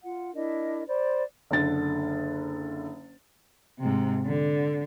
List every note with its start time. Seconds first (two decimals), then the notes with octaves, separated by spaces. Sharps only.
0.03 F4 F#5
0.34 D4 E4 A#4 D#5
0.87 C5 D5 B5
1.51 F#1 D3 A6
3.80 G#2 C3
4.26 D3